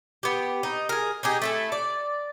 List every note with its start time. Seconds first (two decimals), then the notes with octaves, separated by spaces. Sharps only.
0.23 B3 G4
0.63 D#4
0.89 G#4 A#4
1.23 D#4 G4 G#4
1.42 A3 E4 A4
1.72 D5